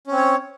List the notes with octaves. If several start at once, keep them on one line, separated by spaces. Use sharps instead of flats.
C4 C#4 C#5